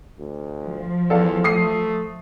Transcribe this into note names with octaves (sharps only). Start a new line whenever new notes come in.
D2
F3
E2 A4 F5
A3 D#6 C7